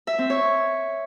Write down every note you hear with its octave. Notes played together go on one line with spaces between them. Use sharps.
E5
C4
C#5